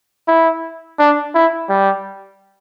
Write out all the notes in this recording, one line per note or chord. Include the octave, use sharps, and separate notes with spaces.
E4
D4
E4
G3